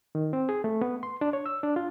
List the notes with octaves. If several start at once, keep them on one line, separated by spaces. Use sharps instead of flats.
D#3
C4
G#4
A3
B3
C6
D4
C#5
E6
D4
F4